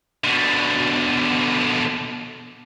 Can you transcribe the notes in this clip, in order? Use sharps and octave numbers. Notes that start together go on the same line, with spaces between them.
B2 D3